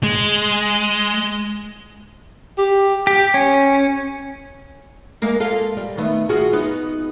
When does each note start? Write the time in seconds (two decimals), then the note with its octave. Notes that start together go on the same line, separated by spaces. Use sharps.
0.03 G#3
2.58 G4
3.07 G4
3.34 C#4
5.22 G#3 A#3 A#4
5.40 F4 A4 F5
5.77 G3
5.97 D#3 A3 B3
6.29 F4 F#4 G#4
6.53 B3 D#4